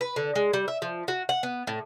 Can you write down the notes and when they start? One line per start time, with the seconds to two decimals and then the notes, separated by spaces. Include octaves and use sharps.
0.01 B4
0.16 D3
0.36 G#3
0.53 G3
0.68 E5
0.82 F3
1.08 F#4
1.29 F#5
1.43 B3
1.67 A2